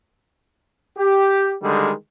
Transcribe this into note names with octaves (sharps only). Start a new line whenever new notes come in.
G4
D3 D#3 G3 G#3